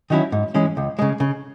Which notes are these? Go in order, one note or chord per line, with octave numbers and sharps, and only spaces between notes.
D#3 F#3 C#4 E4
G#2
E3 G#3 C#4
C#2
C#3 G#3
C#3